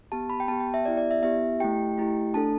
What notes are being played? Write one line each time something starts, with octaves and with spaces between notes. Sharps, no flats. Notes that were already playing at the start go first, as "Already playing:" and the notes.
B3 G4 A5
B5
G5
B3 G4 A5
G5
E5
B3 E4 G4 D5
D5
E5
B3 E4 G4 E5
A3 E4 G4 G5
A3 E4 G4
A3 D4 A4 A5